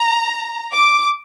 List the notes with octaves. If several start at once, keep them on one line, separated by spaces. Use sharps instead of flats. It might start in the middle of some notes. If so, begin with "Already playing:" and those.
Already playing: A#5
D6